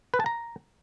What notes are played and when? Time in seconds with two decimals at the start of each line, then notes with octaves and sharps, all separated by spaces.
0.14 B4
0.20 A5
0.26 A#5